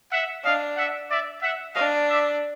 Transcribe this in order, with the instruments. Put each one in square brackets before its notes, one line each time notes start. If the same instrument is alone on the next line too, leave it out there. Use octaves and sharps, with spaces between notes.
[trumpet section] E5 F#5
[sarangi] D4 [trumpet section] D#5 F5
[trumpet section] E5 F#5
D5 E5
E5 F#5
[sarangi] D4 [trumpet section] D#5 F5
[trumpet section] D5 E5